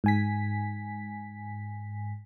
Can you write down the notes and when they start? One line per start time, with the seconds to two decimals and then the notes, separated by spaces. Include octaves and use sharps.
0.04 G#2 G#5 B6